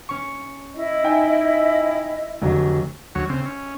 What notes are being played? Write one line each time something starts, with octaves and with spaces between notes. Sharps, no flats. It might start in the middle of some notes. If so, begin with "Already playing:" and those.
C#4 C#6
E4 D#5
D#4 G5 G#5
F1 D3 F#3
D2 F#3 C#5
C#3 C4
C#4